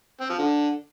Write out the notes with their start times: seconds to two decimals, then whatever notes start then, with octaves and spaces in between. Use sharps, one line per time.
0.21 C4
0.30 F3
0.39 D3